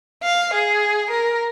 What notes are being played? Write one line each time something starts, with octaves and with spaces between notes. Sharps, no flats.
F5
G#4
A#4